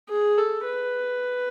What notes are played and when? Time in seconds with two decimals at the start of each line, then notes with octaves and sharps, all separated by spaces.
0.09 G#4
0.38 A4
0.66 B4